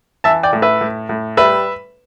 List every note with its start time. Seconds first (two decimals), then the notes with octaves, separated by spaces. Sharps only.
0.24 E3 E5 A5
0.43 D5 G5
0.53 A2
0.62 B4 E5
0.81 A2
1.09 A2
1.37 G3 B4 E5